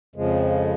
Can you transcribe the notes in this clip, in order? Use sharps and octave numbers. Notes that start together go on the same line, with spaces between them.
F2 C#3 F3 G#3